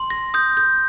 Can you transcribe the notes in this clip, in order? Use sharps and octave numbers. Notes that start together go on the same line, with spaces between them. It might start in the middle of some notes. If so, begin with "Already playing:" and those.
Already playing: C6
A#6
D#6 G6
G6